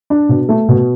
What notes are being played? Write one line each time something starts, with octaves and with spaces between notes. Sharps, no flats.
D4
B2
A3
B2